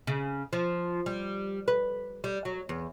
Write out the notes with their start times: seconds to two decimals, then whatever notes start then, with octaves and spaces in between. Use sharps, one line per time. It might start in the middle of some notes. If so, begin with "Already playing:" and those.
0.07 C#3
0.53 F3
1.06 G3
1.68 B4
2.24 G3
2.45 F#3
2.69 E2